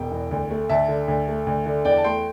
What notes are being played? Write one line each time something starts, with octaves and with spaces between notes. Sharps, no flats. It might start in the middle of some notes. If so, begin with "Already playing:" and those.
Already playing: E1 G5
E2
D2
A3
D2 E5 A5
D3
D2
A3
D2
D3
E2 D5 G5
A5
A3 G5 C6